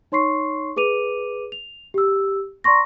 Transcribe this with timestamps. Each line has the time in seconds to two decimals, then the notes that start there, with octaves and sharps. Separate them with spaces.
0.12 D#4 C#5 C6 C#6 C7
0.77 G#4 B4 D6 D#7 F7
1.52 F7
1.94 G4 E6
2.64 D5 A#5 C6 C#6 A#6